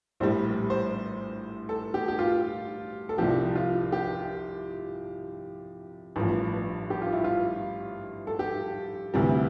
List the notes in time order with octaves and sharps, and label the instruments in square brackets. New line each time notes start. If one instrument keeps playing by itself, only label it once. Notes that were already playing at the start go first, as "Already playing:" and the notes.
[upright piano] A#1 A2 G3 C5
C5
A4
G4
G4
F4
A4
C2 C3 F3 G4
F4
G4
A1 G2 F3
G4
F4
E4
F4
A4
G4
D2 C3 E3 G3